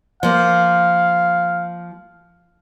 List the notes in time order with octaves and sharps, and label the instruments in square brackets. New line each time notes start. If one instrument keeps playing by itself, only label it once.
[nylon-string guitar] F3 A#3 [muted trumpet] F5